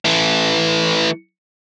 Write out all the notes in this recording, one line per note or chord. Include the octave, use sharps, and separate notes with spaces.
E3 A3